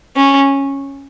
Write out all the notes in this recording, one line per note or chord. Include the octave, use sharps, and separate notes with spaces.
C#4